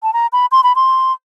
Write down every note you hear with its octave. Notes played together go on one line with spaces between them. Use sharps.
A5
A#5
B5
C6
B5
C6